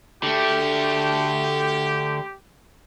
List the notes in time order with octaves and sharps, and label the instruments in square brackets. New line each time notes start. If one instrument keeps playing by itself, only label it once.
[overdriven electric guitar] D3 A3 [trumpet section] G4